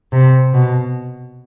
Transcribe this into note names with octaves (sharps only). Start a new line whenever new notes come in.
C3
B2